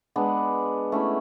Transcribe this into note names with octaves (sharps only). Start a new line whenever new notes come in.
G#3 B3 D4
A3 C#4 E4